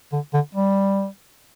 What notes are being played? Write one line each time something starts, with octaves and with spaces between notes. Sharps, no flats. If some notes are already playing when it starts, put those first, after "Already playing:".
D3
D3
G3